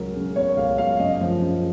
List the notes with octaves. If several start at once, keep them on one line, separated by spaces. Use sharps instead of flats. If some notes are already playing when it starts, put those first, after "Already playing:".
Already playing: C#2 F#3 A#4
C#3
B3 C#5
C#2 F5
F#3 F5
F#2 D#5
F3
C#3